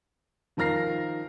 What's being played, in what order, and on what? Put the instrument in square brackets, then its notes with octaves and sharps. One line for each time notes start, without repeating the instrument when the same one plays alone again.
[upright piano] D#3 F3 A#4 F6 A#6 C7